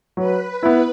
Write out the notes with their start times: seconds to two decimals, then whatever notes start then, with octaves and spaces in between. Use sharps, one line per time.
0.17 F#3 B4
0.63 B3 E4